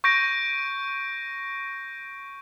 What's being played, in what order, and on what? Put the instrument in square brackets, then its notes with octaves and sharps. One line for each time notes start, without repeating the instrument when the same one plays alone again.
[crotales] C#6 G6 A#6 D7